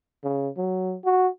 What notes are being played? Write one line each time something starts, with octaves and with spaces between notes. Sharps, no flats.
C#3
F#3
F#4